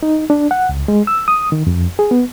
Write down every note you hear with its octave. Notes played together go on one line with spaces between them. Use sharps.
D#4
D4
F#5
C#2
G#3
E6
D#6
D#3
F2
G#4
B3